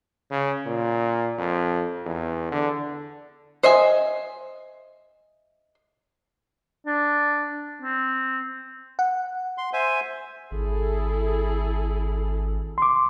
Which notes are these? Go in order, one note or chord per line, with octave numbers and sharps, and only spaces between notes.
C#3
A#2
F2
E2
D3
C5 D#5 E5 G#5
D4
C4
F#5
C6
C5 E5 G#5
G#1 E4 G#4 A4
C6 D6